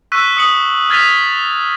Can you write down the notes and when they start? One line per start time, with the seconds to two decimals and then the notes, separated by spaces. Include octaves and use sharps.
0.12 C#6 E6 F#6 B6 D#7
0.37 D#6 C#7 F#7
0.90 F6 G#6 A6 B6 D#7 F7